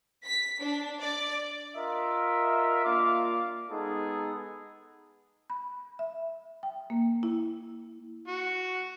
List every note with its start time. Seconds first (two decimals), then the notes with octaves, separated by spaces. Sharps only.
0.24 B6
0.59 D4
1.00 D5
1.76 F4 A#4 D#5 E5
2.85 A#3 D4 F4 F5 D6
3.70 G#3 B3 D#4 G#4 A4
5.50 B5
5.99 E5
6.63 G5
6.90 A#3
7.23 E4
8.28 F#4